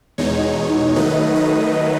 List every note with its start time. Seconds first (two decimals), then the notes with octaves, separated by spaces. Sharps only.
0.18 E2 B2 G#3 D#4 C#5
0.96 D#3 F#3 A3 D#4 B4 D#5
1.35 B4 D#5